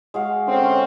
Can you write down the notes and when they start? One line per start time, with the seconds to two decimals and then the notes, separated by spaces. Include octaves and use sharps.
0.14 G#3 F#4 F5
0.47 D3 C4 C#4 C6